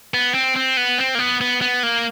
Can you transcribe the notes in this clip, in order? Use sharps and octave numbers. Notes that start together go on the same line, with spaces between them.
B3
C4
C4
B3
C4
A#3
B3
B3
B3
A#3